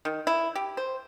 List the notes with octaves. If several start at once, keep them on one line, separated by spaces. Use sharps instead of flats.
D#3
E4
G4
C5